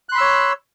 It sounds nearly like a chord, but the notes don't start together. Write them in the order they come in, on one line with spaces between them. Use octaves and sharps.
F#6 C6 B5 E6 C#5